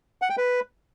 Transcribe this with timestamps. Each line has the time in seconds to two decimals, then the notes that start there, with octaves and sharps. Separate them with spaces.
0.22 F#5
0.30 G5
0.38 B4